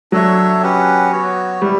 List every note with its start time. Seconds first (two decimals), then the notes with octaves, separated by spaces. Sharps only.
0.12 F#3 D4 A4 C#5 E5
0.62 C#4 G4 B4 F#5
1.11 B3 F#4 C#5
1.61 G3 E4 B4